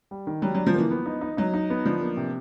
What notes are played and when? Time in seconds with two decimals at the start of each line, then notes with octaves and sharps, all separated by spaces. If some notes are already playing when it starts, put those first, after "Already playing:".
0.11 G3
0.27 D#3
0.42 F#3 G3
0.55 F#3 D4
0.66 F3
0.74 E3 A#3
0.91 B3
1.06 D#4
1.21 D#4
1.37 F#3 D#4
1.54 D#4
1.70 B3
1.85 F3 D4
2.01 A#3
2.17 C3